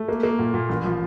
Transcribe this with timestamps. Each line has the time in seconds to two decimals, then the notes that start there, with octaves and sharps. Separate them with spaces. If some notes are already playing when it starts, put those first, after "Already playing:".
Already playing: A3
0.09 A#3
0.23 A#3
0.39 A#2
0.54 A#2
0.69 A1
0.84 F3